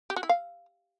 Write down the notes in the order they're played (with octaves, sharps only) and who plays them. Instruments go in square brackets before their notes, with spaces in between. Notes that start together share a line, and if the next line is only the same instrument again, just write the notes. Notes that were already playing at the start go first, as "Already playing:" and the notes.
[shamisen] G4
F#4
E4
F5